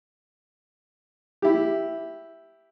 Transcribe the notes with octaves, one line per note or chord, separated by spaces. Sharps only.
E4 G4